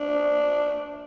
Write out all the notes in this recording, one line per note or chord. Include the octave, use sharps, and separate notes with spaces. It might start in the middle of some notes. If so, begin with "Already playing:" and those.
Already playing: D4